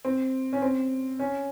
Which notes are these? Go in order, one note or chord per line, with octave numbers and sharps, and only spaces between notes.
C4
C#4
C4
C#4